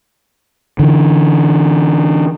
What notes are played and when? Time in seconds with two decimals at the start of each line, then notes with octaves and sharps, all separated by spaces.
0.79 D3 E3